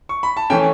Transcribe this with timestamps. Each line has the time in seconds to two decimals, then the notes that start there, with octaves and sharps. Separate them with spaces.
0.09 C#6
0.23 B5
0.37 A5
0.50 E3 A3 C#4 G5